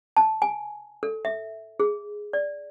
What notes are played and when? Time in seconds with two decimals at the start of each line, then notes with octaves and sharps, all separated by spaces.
0.17 A5
0.42 G#5
1.03 A4
1.25 E5
1.80 G#4
2.33 D5